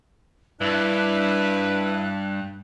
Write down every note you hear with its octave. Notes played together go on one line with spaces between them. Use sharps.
G2 D4 E4 B4 A5 F#6